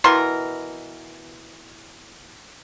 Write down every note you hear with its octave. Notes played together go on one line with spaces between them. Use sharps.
B2 E3 A#4 C6